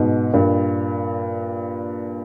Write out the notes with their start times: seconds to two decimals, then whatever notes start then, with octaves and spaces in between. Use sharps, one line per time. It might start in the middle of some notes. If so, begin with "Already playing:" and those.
Already playing: G#2 B2
0.34 G2 A#2